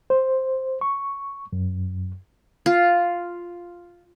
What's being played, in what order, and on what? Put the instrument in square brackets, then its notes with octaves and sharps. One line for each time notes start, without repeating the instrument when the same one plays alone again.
[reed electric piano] C5
C#6
F#2
[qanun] F4